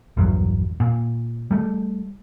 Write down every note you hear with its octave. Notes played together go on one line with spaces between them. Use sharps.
A#1 E2 G2 F#3
A#2
G3 A3